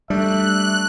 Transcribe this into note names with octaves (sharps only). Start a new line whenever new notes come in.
G3 A3 D4 E5 F#6